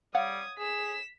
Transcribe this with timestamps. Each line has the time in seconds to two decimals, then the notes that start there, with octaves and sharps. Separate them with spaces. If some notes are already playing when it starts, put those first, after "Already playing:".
0.15 G3 C#5 F5 F#5 D#6 G#6
0.58 G#4 B6 E7